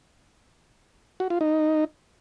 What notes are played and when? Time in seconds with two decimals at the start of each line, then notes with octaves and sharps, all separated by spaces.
1.20 F#4
1.30 F4
1.41 D#4